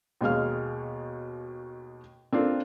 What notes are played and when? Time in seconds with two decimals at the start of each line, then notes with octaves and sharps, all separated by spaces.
0.21 D#2 B2 G#3 F5 F6
2.33 C4 D4 F4 A4 A#4